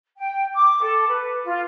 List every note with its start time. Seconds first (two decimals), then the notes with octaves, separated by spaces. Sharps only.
0.18 G5
0.53 D6
0.82 A4
1.07 B4
1.44 F4